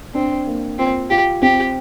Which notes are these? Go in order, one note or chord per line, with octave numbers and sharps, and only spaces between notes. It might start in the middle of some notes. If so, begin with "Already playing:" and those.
C4 D4
A#3
C4 F4
F4 G4
C4 G4